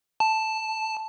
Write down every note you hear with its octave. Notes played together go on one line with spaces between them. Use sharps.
A5